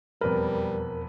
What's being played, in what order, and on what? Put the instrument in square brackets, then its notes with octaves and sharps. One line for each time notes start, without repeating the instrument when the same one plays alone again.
[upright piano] E1 F2 B4 [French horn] G3 [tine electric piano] A#4